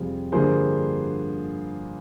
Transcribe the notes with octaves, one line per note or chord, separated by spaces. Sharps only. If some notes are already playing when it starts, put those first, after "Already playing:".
Already playing: F2 C3 G3 F4 G#4
G2 D3 F3 A#3 G#4 C5